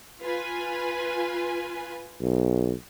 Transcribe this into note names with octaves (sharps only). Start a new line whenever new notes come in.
F4 B4 G#5
B1